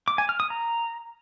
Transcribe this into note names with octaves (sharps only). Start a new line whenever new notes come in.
D6
G#5
F6
D#6
A#5